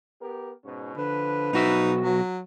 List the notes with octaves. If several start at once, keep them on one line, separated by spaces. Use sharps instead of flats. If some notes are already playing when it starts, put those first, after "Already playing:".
B3 G4 A#4
G#2 B2 C#4
D3 F3 B4
B1 D#4 F#4 E5
F#3